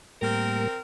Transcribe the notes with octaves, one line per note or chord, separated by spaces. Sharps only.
A2 G3 A#3 C4 A#4